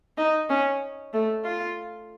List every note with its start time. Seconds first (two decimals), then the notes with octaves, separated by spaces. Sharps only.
0.18 D#4
0.50 C#4
1.13 A3
1.45 F4